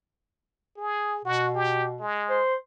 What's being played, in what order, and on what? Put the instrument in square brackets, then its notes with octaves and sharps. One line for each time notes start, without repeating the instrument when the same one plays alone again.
[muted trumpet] G#4
[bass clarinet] B2 [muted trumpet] F#4
[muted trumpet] G4
G#3
[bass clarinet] C5